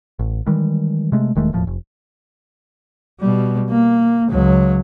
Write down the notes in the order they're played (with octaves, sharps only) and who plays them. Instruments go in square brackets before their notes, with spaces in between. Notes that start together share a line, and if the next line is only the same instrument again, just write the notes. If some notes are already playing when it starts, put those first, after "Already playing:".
[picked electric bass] A1
D#3 E3 G3 G#3
C3 G#3 A3
E1 D#3 G#3 A3
E1 D#2 A2 F3
F1
[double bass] B2 G3
A#3
C#2 F#3